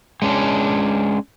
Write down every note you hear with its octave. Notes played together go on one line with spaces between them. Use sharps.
G#3 C#4 D4